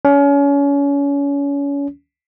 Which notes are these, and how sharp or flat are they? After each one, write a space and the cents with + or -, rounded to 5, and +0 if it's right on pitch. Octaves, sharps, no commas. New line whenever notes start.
C#4 +30